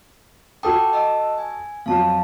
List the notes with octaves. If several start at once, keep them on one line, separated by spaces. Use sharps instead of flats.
F#4 A4 G5 A5 D6 D#6
D#5 A5 E6
G#5
F2 F#3 F5 A5